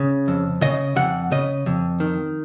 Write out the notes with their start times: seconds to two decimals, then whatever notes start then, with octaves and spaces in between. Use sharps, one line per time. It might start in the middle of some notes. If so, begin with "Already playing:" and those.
Already playing: C#3
0.28 F2
0.61 C#3 D#5
0.96 F2 F#5
1.31 C#3 D#5
1.66 F2
2.00 D#3